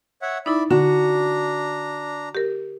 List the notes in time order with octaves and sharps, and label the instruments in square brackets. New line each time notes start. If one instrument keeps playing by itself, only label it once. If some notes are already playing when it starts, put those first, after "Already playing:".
[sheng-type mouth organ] C#5 E5 F#5
[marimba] D#4 E4 [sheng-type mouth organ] D5 E5 B5
[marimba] D3 [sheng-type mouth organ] D4 A#5 [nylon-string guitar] F#4
[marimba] G4 A#4